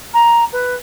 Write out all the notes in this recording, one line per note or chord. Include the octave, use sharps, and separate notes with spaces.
A#5
B4